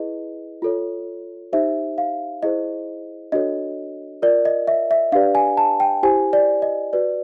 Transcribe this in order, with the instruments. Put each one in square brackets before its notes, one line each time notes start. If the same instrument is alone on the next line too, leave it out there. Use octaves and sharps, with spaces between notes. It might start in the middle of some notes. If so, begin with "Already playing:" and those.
Already playing: [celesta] E4 G#4 B4 D#5
F4 A4 C#5
D#4 G4 C5 E5
F5
E4 G#4 C5 D#5
D4 F#4 A4 C#5 D#5
F4 A#4 D5
D#5
E5
E5
D4 G4 B4 D5 F5
G#5
A5
G5
E4 G4 C5 G#5
D5
D#5
F#4 B4 D5